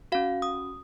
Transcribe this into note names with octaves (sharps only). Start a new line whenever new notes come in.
C#4 F#4 F5
D#6